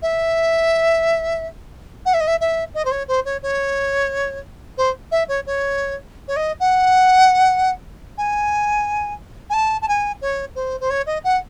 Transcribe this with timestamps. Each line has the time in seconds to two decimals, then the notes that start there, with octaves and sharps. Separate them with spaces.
0.02 E5
2.05 F#5
2.14 E5
2.20 D#5
2.27 E5
2.40 E5
2.74 D#5
2.85 C5
2.91 C#5
3.08 C5
3.25 C#5
3.43 C#5
4.77 C5
5.11 E5
5.28 C#5
5.46 C#5
6.28 C#5
6.36 D#5
6.60 F#5
8.18 G#5
9.50 G#5
9.53 A5
9.82 A5
9.88 G#5
10.21 C#5
10.55 C5
10.80 C5
10.90 C#5
11.06 D#5
11.24 F#5